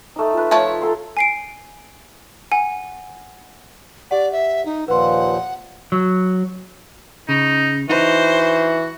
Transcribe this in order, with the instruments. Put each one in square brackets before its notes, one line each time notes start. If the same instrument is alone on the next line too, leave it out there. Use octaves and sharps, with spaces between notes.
[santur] A3 D#4
F4 B4
[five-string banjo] F3 A3 C#5
[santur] A4 A#5 C6
[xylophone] G#5 C7 D7
F#5 G#5
[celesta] G4 F#5 [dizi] D5
[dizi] E5
D#4
[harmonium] D#2 A#2 F3 [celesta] B4 C6 [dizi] F#5
[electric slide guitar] F#3
[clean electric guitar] C#3 [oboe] D#4
[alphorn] E3 [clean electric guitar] D#4 [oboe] F#4 [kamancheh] C5